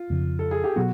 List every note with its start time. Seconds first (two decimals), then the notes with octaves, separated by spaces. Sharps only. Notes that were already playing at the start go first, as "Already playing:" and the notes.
Already playing: F4
0.10 F2 C#3 F3
0.39 A4
0.51 G#4
0.64 G4
0.76 B2 F#3 B3 F#4